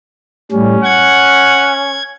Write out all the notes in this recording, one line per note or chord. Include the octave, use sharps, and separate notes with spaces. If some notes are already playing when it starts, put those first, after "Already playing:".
A2 G3 C#4
F#5 G#6